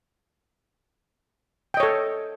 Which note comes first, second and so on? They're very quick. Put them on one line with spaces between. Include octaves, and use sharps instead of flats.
G5 D#5 C#5 A4